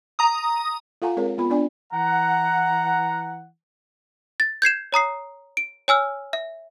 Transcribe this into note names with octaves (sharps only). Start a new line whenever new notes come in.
A#5 D#6
F4 A4 F5 F#5 G#5 A#5
G#3 C4 G#4 A#4 C#5
B3 F4 B5
B3 D4 D5 G#5
E3 F#5 A#5
A6
G6 G#6 C7 E7
C#5 A#5 D#6 C7
D7
C#5 G#5 E6 F6
E5